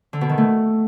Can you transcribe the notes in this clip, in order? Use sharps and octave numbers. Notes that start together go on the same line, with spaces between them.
D3
B2
D#3
A3